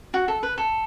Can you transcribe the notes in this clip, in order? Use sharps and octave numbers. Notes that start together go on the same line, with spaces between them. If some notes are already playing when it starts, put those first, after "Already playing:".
F#4
A4
B4
A4